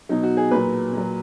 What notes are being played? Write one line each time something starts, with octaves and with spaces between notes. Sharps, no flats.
B2 F#3 D#4
F#4
G#4
A#2 F#3 B4
A#2 F#3